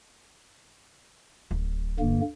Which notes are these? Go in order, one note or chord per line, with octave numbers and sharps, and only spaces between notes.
D1
G2 D3 A#3